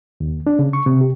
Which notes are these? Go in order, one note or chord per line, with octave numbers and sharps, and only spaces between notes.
D#2
D4
C#3
C#6
C3
G4